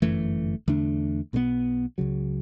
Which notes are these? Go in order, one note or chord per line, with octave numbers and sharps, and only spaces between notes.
G1 F#2 E3 A3
E2 D3 A3 D4
B1 B2 G3 B3
C#2 C#3 F#3